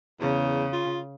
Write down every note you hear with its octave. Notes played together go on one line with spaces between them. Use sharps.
E2 C#3
F4